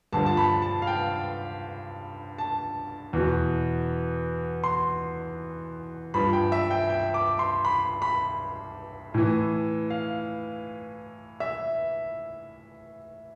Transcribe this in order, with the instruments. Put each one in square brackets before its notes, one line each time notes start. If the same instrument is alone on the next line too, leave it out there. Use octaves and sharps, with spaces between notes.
[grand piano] G2 D3 F3 A5
A5
B5
A5
F5
G5
A5
E2 B2
C6
G2 F3 B5
G5
E5
G5
G5
D6
C6
B5
B5
A2 E3
F5
E5